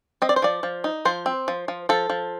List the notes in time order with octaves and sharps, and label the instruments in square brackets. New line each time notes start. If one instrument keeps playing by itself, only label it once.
[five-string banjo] C4 D#5
D5
C5
F3 D5
F3
D#4
F3 C5
C4
F3
F3
F3 A4
F3